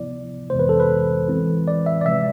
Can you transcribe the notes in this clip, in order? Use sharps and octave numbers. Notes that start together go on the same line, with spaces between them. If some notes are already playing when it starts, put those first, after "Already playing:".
Already playing: C3 F3 B3 E4 D5
F2 C3 E3 G#3 B3 C5
B4
A4
B4
E3 G#3 C4 E4
D5
E5
D5
C3 F3 G#3 E5